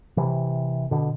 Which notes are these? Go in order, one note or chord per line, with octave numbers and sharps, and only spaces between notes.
C3 E3
B2 D3